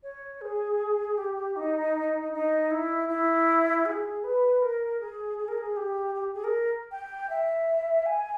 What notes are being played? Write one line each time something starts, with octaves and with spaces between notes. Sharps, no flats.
C#5
G#4
G4
D#4
D#4
E4
E4
G#4
B4
A#4
G#4
G#4
A#4
G#4
G4
G4
G#4
A#4
G5
E5
G#5